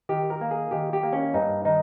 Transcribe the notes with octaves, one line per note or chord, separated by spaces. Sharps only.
D#3 G4
A#4
A#3
G#4
D#3 G4
G4
A#3
C#4
G2 D#4
D#3 D#4